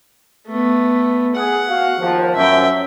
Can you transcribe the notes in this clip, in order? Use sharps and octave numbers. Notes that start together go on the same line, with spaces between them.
A3 B3
G#4 F#5
F#4 F5
D#2 F3
F#2 E5 G5